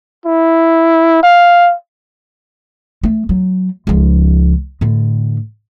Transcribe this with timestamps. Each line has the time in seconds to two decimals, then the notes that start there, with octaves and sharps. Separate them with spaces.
0.26 E4
1.23 F5
3.03 A3
3.29 F#3
3.87 C#2 F3
4.81 A2 D3